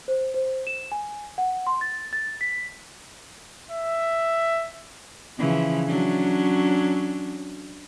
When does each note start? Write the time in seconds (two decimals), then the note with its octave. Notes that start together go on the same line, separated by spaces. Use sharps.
0.08 C5
0.34 C5
0.67 E7
0.92 G#5
1.38 F#5
1.67 C6
1.81 A6
2.13 A6
2.41 B6
3.71 E5
5.38 C#3 E3 F3
5.87 F#3 C#4 D4